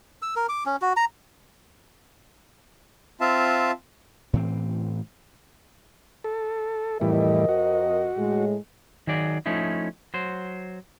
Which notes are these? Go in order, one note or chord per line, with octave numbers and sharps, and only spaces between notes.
E6
A#4
D6
C#4
F#4
A#5
C4 F4 E5 F5 A5
A2 E3 C4
A4
F2 A2 E3 G3 A#4 D#5
F#4
A2 G#3
D#3 F#3 G#4 D5
F3 A3 C#4 D#4 E4
F#3 C5